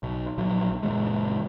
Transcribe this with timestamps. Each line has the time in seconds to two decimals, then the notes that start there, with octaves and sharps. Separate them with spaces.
0.03 B1
0.38 A#1 F#3
0.83 F#1 A#2 E3 G#3